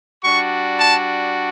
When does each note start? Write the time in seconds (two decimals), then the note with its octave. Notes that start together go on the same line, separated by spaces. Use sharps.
0.23 G3 D4 F#4 C#6
0.78 A5